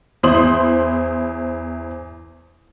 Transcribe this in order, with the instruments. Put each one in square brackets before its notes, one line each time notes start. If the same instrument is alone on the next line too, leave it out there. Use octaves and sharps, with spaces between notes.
[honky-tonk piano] E2 E4 C5 C6 D#6 F#7